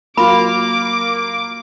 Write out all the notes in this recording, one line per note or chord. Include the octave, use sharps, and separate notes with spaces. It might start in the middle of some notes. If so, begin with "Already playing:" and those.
F#3 A#3 F4 B5 D6